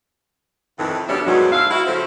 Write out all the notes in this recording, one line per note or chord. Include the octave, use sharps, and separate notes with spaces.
F2 A2 D#3 E3
D2 B2 G3 C#4 D4 E5
E2 G#2 B2 D#3 F#3
G#3 D4 E5 F5
E4 F#4
C#3 F3 F#3 A3 E4 C5